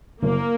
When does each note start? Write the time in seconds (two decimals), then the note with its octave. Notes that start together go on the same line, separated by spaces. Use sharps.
0.22 F#1 A#3